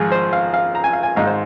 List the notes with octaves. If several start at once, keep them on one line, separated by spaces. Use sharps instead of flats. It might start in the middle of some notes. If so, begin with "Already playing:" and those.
Already playing: G#1 G#2 F3 F4 G#4
C5
F5
F5
A#5
G#5
F5
G#5
G#1 G#2 G#3 D#4 F5
C5